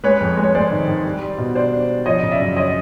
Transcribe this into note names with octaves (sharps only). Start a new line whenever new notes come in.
G#3 B4 C#5
F2
G#3
C#5
G#3 C5 D5
D#3
D#3
G3
G3
B2
D4 C5 D5
D4
D4
F3 C#5 D#5
C#3
D5 E5
F#2
C#5 D#5